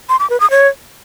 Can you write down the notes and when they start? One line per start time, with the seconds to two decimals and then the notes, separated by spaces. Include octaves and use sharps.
0.09 C6
0.20 D6
0.30 B4
0.40 D#6
0.51 C#5